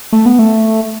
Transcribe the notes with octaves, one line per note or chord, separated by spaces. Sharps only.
A3
B3
A3